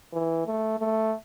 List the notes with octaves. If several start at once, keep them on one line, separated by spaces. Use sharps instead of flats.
E3
A3
A3